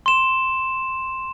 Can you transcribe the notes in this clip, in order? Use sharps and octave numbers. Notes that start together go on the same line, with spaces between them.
C6 E7